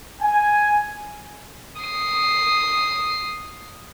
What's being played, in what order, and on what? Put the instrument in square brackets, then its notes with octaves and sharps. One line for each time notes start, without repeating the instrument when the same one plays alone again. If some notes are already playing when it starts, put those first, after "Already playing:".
[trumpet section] G#5
[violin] D#6 C7